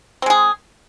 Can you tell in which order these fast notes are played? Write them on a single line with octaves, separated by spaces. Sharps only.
C4 G#3 G#4